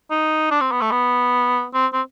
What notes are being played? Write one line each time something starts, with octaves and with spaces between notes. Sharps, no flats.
D#4
D4
C4
B3
A3
B3
C4
C4